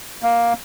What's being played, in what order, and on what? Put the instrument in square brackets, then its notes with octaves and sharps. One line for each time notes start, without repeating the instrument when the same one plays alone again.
[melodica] A#3